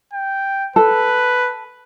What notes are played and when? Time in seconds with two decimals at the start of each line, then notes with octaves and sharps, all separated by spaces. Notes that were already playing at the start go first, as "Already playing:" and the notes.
0.13 G5
0.76 A4 B4